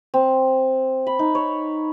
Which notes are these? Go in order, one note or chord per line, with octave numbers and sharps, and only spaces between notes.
C4
B5
D#4
C#5